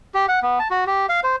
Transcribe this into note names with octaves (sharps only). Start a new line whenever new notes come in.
G4
F#5
B3
A5
F#4
G4
F5
C5